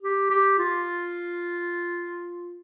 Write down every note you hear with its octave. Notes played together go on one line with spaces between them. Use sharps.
G4
G4
F4